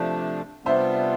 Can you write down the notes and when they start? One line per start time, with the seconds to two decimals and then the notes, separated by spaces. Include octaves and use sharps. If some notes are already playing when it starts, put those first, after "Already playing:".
Already playing: C3 F3 A3 D4
0.65 C3 G3 B3 D4 F4 C5 E5